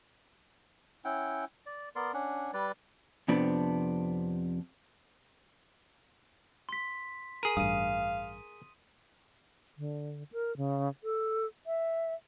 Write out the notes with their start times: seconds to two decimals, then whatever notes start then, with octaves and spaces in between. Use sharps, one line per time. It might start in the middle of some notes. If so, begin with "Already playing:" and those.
1.05 C#4 E4 F#5 G5
1.66 D5
1.96 B3 A#4 D5 C6
2.14 C#4 D4 F#5
2.54 G3 B4 D5
3.28 F2 C3 B3 D4
6.69 C6 B6
7.43 G#4 A#4 D#7
7.57 A1 G2 F5 D#6 D#7
9.78 D3
10.32 A#4
10.57 C#3
11.04 A4
11.67 E5